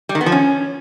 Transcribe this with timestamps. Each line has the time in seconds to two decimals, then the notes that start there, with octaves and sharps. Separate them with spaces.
0.09 G3
0.15 D#3
0.21 B3
0.26 F3
0.32 C#4